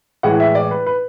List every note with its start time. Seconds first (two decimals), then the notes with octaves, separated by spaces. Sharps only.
0.23 A2 E3 G#3 F#5
0.40 E5
0.55 D5
0.71 B4
0.86 B4